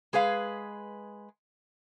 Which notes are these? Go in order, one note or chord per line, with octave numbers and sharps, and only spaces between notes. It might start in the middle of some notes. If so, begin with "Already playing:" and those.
G#3 G#4 B4 F5